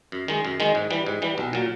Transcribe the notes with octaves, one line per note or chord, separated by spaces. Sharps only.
F#2
D#3 G#3
F#2
D#3 G#3
G#2
E3 G3
G#2
E3 G3
B1
A#2 F#3